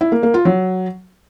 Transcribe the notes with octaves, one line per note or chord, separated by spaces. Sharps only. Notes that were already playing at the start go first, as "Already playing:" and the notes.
E4
A#3
A#3
F4
F#3